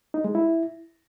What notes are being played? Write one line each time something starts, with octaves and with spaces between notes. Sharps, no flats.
D#4
G#3
E4